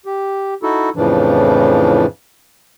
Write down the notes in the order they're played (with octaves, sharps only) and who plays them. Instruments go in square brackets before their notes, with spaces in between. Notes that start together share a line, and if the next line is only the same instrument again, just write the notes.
[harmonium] G4
D#4 E4 F#4 A4
F2 A2 C#3 E3 F3 D4